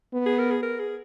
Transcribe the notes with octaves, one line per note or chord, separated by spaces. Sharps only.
B3
G#4
A#4
G#4
A#4
G#4